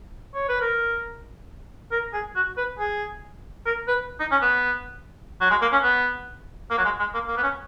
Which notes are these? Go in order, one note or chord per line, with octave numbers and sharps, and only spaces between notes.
C#5
B4
A#4
A#4
G#4
F#4
B4
G#4
A#4
B4
D#4
C#4
B3
F#3
G#3
A#3
C#4
B3
A#3
F#3
G#3
G#3
A#3
A#3
B3
C#4